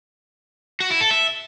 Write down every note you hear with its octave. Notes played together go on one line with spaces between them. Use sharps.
F#4
E4
A4
E5